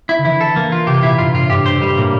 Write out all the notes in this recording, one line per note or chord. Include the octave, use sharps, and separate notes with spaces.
E4
D3
E3 E4
A4
E3 A#3
F4
C3 G4
A#2 E4
G2 F4
A2 F4
G2 G4
C5
G2
A2 G3
A#2 A#3